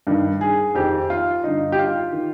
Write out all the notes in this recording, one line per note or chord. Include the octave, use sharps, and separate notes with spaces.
G2 D#3
G#4
F2 D#3 G4
F4
G2 D3 D#4
G4
F4
D#3